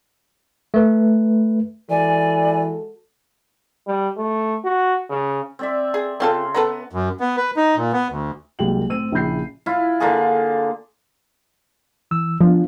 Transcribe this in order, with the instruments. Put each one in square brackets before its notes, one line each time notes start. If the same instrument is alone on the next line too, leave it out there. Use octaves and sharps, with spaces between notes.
[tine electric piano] A3 B4
[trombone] E3 [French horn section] G#3 F#4 A4 [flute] D5 [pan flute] G#5
[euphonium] G3
A3
F#4
C#3
[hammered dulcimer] C4 D5 E5
[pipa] G#4
[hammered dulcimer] C#3 C6 [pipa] C4 F4 A4
[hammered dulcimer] B3 [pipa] A4 B4 A#5
[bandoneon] F#2
B3
B4
D#4
A#2
B3
D2
[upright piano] C2 F#3 G#3 A#3 G5 F#7
A2 C4 E6 D#7
A#1 C#3 E4 B5 G6 C7
[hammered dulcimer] E4 F4
D3 A#3 F4 G#4
[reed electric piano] E3 E6
[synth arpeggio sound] F3 [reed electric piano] B3 D4 F4